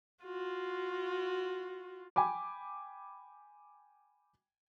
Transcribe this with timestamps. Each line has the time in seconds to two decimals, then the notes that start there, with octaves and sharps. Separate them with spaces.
0.23 F4 F#4
2.16 G5 G#5 B5 D6